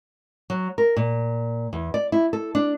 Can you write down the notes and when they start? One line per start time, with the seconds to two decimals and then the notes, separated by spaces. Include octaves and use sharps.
0.50 F#3
0.78 A#4
0.96 A#2
1.73 E2
1.94 D5
2.12 E4
2.33 A4
2.55 D4